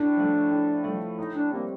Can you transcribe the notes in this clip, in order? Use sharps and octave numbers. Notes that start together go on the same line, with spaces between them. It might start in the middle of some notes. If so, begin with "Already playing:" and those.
Already playing: A2 D4
F3 A3
A2
F3 A3
A2 D#4
D4
G3 A#3 C4